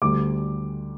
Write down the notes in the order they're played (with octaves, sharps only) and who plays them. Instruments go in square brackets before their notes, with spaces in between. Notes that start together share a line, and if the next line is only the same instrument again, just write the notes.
[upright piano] D2 D3 G3 D6